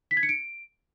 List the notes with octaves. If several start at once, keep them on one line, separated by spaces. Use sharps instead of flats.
B6
G#6
C#7
D7